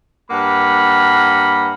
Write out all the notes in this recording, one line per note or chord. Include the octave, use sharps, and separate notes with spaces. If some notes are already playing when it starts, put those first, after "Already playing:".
G2 A#3 F#5 B5